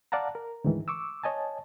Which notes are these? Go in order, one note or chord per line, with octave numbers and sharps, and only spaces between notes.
D5 F5 F#5 A5 A#5
A#4
D2 G#2 D#3 E3
C#6 D6 E6
C#5 D#5 G#5 A5